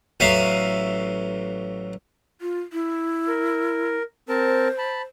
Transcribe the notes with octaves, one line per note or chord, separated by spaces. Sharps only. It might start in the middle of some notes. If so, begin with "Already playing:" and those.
A1 F#3 E5 F5 D#6
F4
E4
A#4
C4 A#4 C5 A5
A5 B5